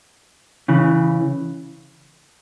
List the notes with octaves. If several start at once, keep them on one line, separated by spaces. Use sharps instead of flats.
C#3 E3